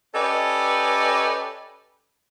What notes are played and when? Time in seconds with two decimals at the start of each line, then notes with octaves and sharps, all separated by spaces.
0.15 C#4 G4 A4 B4 D5 D#5